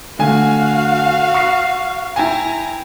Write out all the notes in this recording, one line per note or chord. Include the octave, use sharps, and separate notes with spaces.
D3 A3 F#4 F5 G#5
C#6 C7
E4 G5 G#5 A#5